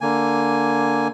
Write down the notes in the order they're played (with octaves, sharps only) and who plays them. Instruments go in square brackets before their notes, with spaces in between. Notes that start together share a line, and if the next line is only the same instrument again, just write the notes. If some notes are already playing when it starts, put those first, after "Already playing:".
[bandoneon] D3 A#3 G#5